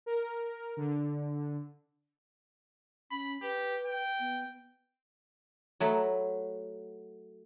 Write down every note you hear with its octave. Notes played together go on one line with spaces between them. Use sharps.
A#4
D3
C#4 B5
G4 B4
G5
B3
F#3 A3 B5